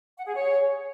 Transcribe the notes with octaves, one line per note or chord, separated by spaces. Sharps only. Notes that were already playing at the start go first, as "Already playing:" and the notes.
F#5
G#4
C#5